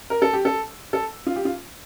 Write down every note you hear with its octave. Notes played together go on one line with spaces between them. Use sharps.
A#4
A4
G4
A4
A4
F4
G4
F4